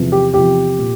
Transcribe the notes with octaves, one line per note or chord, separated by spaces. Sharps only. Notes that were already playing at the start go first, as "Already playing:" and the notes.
Already playing: E2 C3 F3
G4
E2 C3 F3 G4
A#2